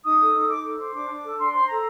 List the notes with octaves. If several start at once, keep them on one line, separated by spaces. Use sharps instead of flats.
D#4 D#6
A4
D#4
D#4 D6
A4 D6
C5 D6
D4 D6
D4
A4
D4 C6
C5 C6
A4 A#5